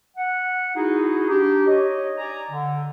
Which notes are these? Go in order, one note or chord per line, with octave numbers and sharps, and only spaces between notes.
F#5
D#4 E4 F#4 G#4
D4 D#4 G4
C#5 D#5
D5 G#5 A#5
D3